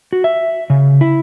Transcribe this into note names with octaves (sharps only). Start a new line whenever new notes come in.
F#4
E5
C#3
E4